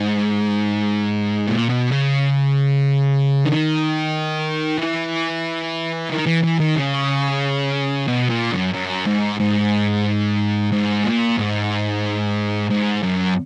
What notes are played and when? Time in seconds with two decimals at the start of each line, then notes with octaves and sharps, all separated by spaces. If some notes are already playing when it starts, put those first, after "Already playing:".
Already playing: G#2
1.48 A#2
1.70 B2
1.92 C#3
3.45 D#3
4.78 E3
6.10 D#3
6.26 E3
6.43 E3
6.59 D#3
6.76 C#3
8.08 B2
8.29 A#2
8.52 F#2
8.74 F#2
9.07 G#2
9.40 G#2
10.72 G#2
11.04 A#2
11.37 G#2
12.70 G#2
13.03 F#2